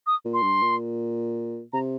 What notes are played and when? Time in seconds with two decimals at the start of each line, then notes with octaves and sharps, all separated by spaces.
0.07 D#6
0.25 A#2
0.34 C6
0.43 G2
0.62 A#2
1.73 C3 A#5